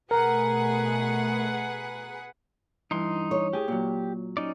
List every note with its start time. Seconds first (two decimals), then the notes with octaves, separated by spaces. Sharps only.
0.11 B2 A3 G#4 A#4 B4 F#5 A#5
2.91 G2 E3 D#4 C6
3.31 C#5
3.53 A2 G4 G#4
3.68 A#2 F#3
4.37 C#4 D#4 D5